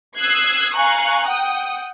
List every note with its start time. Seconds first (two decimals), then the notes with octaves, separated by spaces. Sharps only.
0.17 D#6 E6 F#6 G#6 C7
0.75 F5 G#5 A#5 C#6 F#6
1.28 F#5 G5 D#6